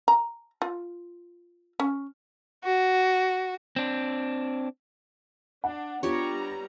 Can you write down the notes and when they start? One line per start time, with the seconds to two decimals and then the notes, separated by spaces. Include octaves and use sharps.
0.08 A#5
0.62 F4
1.80 C#4
2.64 F#4
3.76 C4 D4
5.64 D4 F#5
6.03 G3 B3 D4 F4 G4 C#5 A#5